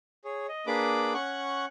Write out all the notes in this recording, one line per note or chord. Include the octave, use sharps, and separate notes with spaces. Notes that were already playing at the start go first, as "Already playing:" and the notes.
G#4 C#5
D#5
A#3 D4 G#4 B4 B5 D6
C#4 F#5 C#6 F#6